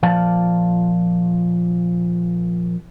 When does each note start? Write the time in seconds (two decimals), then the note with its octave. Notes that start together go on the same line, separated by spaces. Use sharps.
0.03 A#2 F3 D5 F5 A5